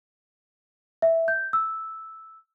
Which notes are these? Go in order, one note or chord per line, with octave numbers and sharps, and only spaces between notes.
E5
G6
E6